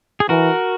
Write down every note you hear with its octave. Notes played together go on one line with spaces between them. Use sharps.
G#4
E3 F#4 A#4